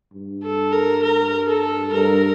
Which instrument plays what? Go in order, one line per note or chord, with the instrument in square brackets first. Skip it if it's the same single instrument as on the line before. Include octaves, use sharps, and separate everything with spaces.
[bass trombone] G2
[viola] A4
A#4
A#4
A4
[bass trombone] G2 [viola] A#4